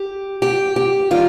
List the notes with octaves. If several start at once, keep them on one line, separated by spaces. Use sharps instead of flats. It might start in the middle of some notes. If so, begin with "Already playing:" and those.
Already playing: G4
G4
G4
D#3 G3 F4